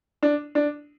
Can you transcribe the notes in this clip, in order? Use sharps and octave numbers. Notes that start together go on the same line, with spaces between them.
D4
D4